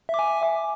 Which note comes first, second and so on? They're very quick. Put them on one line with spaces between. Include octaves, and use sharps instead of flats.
E5 D6 G#5